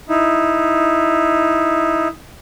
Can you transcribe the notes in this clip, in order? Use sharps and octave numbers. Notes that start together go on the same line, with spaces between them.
D#4 E4